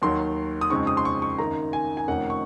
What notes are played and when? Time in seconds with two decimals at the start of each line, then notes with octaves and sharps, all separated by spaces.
0.02 D#2 D#3 F#3 C6
0.61 D#6
0.70 F2 C#3 G#3 C4 D#4 C#6
0.87 D#6
0.97 C6
1.05 C#6
1.22 C#6
1.38 F#2 D#3 A#3 D#4 A#5
1.73 G#5
1.97 G#5
2.08 F1 F2 D#3 A#3 C#4 F#5
2.30 C#6